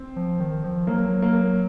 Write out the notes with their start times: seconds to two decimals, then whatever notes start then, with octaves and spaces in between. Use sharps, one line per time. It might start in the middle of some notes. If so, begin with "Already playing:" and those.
Already playing: C4
0.16 F3
0.40 D#3
0.64 F3
0.87 F#3 A#3
1.22 A#3